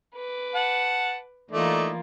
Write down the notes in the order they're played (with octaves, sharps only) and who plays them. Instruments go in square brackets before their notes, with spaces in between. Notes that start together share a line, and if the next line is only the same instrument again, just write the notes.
[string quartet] B4 D6
[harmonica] F#5 A5
[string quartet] E3 A#3 F4 [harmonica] A3 D#4 D5